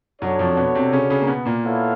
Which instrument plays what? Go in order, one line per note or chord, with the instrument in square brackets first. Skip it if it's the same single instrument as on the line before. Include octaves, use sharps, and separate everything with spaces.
[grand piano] F#2 F#3 [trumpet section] D4 F#4 A4 C#5
[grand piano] F2 F3
B2 B3
C3 C4
C#3 C#4
C#3 C#4
A#3
B2 B3
A#2 A#3
[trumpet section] B3 E4 A4 C#5 F5